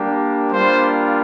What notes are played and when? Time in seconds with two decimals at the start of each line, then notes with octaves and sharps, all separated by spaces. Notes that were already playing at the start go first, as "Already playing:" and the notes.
Already playing: G3 A#3 D4 G4
0.53 G3 A#3 D4 F4 C5